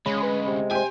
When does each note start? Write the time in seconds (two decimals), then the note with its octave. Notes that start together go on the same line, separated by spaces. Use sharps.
0.06 D2 C#3 G#3 C#4 B5
0.22 B4
0.47 C3
0.71 G4 C5 G#5